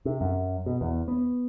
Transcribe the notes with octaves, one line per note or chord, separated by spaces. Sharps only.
C3
F#2
B2
E2
B3